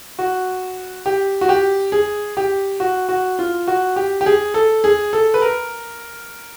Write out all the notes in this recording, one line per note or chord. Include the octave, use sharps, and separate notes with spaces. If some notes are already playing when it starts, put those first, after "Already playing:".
F#4
G4
F#4
G4
G#4
G4
F#4
F#4
F4
F#4
G4
G4
G#4
A4
G#4
A4
B4
A#4